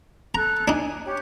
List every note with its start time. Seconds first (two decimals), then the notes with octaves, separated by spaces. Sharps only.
0.35 A4 A#5 F#6
0.68 D4 D#4 G#5
1.05 G4 C#5